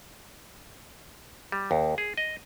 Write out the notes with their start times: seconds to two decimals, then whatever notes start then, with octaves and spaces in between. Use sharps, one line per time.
1.52 G3
1.71 D#2
1.98 G#4
2.17 D#5